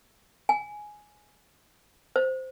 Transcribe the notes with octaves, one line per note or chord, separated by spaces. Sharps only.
G#5
C5